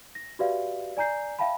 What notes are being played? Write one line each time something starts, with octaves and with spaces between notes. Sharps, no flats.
A#6
F#4 G4 B4 D5 E5 F5
D5 G#5 A#5 G6 C7
E5 F5 G5 A5 B5